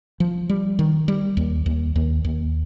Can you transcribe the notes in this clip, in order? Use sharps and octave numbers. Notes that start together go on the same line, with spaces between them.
F3
G3
D#3
G3
D#2
D#2
D#2
D#2